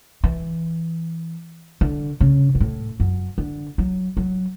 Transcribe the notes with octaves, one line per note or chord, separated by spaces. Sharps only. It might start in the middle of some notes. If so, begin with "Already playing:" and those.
E3
D3
C#3
B2
A2
F#2
D3
F#3
F#3